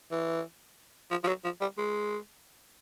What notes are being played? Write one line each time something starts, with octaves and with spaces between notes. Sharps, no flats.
E3
F3
F3
F#3
F3
G3
G#3